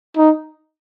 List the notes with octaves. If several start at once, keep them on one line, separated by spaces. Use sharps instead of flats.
D#4